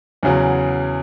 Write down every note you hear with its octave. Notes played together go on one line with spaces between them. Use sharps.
E2 C#3 F#3